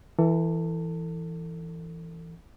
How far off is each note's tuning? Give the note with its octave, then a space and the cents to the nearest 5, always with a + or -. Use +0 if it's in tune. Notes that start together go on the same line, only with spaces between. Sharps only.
E3 +0 A4 +30